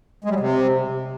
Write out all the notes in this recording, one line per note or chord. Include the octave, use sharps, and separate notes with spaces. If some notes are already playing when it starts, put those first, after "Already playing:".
G#3
G3
F#3
C3